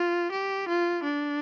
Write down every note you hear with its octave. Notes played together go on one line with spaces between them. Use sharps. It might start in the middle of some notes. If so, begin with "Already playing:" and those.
Already playing: F4
G4
F4
D4